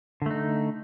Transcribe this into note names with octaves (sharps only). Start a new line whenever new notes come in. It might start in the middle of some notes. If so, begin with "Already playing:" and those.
D3 A3 D#4